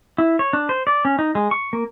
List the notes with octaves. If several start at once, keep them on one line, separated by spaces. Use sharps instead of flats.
E4
C#5
D4
C5
D5
C#4
D#4
G#3
C#6
A#3